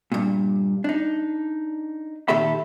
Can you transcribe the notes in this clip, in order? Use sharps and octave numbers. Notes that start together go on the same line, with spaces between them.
G2 A#2
D4 D#4
A#2 D#3 G4 A4 E5 B5